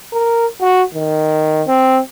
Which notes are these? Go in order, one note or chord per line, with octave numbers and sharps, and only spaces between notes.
A#4
F#4
D#3
C4